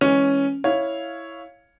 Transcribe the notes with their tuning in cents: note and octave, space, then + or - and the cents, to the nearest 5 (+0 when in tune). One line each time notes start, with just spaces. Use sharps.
E3 +0 G#3 +0 C#4 +0
E4 +0 C#5 +0 F5 +0